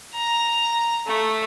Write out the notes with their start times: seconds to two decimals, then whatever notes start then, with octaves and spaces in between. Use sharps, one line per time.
0.14 A#5
1.07 A3